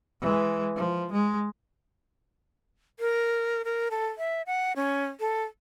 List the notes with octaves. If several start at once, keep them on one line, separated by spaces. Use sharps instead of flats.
E3 G#3
F3
G#3
A#4
A#4
A4
E5
F#5
C#4
A4